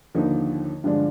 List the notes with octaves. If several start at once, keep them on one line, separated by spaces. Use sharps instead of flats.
D#2 D3 F3 A#3 D#4
G2 D3 F3 G#3 D4